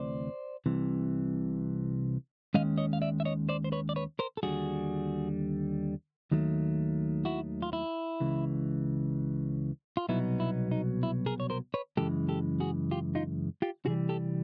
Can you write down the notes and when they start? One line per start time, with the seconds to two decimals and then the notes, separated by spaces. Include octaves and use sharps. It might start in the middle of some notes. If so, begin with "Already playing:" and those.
Already playing: D2 C3 E3 A3 C4 C5 D5
0.66 C2 C3 E3
2.54 D#2 D#3 G#3 C#4 D#5 F5
2.78 C#5 D#5
2.93 F5
3.02 D5 E5
3.20 E5
3.25 C#5 D#5
3.49 C5 D5
3.64 C5
3.72 B4 C#5
3.89 D5
3.96 B4 C#5
4.19 A#4 C5
4.37 A4
4.43 D#2 D3 G3 F#4 G#4
6.31 D#2 D#3 F#3 A3
7.25 E4 F#4
7.62 F4
7.73 E4
8.20 C#2 C#3 E3
9.97 F4
10.09 C2 B2 F#3 B3 D#4 E4
10.40 E4
10.71 D#4
11.03 E4
11.26 G#4 A#4
11.40 C#5
11.50 A#4 C5
11.74 B4 C#5
11.97 F#2 C#3 E3 G#3 G4 A4
12.29 G4 A4
12.60 F#4 G#4
12.91 F4 G4
13.15 D#4 F4
13.62 F4 G4
13.86 C3 E3 G3 F#4 G#4
14.09 G4 A4